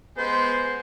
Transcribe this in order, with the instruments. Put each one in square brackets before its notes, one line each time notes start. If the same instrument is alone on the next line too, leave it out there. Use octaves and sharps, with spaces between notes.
[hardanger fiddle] G#3 [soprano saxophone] B3 [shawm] C5